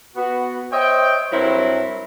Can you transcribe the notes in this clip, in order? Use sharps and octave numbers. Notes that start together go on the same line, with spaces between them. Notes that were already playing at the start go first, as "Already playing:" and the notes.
B3 F#4
C5 C#5 D#5 E5 G5
G2 F#3 C4 E4 A#4 B4